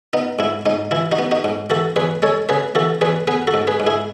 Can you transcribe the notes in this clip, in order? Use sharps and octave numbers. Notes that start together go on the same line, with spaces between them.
B3 D#4
G#2 E4
G#2 D#4
E3 E4
D#4 F#4
B3
D#4 F#4
G#2
E3 F#4 A4
E2 G#4 B4
G#3 A4 C#5
C#3 G#4 B4
E3 F#4 A4
E2 G#4 B4
B3 G#4 B4
F#4 A4
G#2
G#4 B4
G#2
E4 G#4